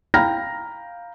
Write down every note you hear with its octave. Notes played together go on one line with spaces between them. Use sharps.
F5 G5 A#5 B5 F6 A#6